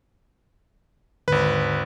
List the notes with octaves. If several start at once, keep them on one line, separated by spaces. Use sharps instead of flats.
G#1 D#2 G#2 D3 B4